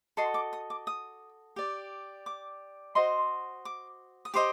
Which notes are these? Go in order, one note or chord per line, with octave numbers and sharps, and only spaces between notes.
F#4 A4 D#5 C6
D6
D#6
D6
D#6
G4 D5
D6
F#4 C5 D#5 C6
D6
D#6
G4 C5 D#5 D6